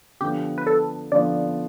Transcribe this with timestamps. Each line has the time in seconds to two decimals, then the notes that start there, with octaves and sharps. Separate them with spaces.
0.21 D3 F3 B3 G4
0.58 B4
0.67 A4
1.12 D3 F3 B3 D5